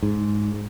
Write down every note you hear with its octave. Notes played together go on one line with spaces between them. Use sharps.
G#2